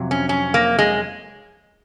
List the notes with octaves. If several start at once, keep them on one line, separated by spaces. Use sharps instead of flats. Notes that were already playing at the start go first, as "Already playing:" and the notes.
Already playing: F2 C3 F#3
C#4
C#4
A#3
G#3